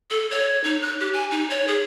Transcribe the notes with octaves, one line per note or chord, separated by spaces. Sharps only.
A4
C#5
D#4
F#6
G4
G#5
D#4
C#5
G#4